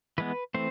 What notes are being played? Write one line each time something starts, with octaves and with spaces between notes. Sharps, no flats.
E3 G#3 B3 B4
E3 A3 C4 C5